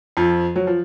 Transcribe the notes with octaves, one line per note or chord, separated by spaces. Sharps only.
F2 F3
F#3
F3